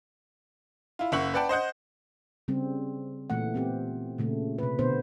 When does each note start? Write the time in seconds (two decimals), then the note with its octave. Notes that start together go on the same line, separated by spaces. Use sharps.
0.99 E4 F4
1.12 F#1 A#3 E5 F#5 C#6 F#7
1.34 B4 D5 F#5 G5 A5
1.49 C5 D#5 F#5 G6
2.48 C#3 G3 C4
3.30 A#2 E3 A3 F#5
3.54 B3 C4 G4
4.18 A#2 C#3 A3
4.58 C3 B4
4.79 B2 D3 B3 C5